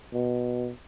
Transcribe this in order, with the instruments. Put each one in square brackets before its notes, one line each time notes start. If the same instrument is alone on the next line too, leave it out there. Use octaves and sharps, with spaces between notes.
[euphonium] B2